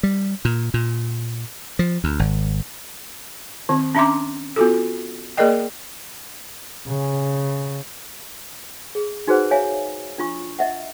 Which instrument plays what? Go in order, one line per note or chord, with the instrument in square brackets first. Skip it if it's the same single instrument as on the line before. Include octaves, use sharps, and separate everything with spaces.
[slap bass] G3
A#2
A#2
F3
D2
G#1
[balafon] D#3 C4
C#4 D4 E5 A#5 C6 D6
B3 F4 F#4 A4
A#3 G#4 A#4 D5 D#5 G5
[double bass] C#3
[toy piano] G#4
D#4 F#4 G#4 B4 C5 F#5
C#5 E5 F5 G#5 A#5
D4 F4 C#6
D#5 E5 F#5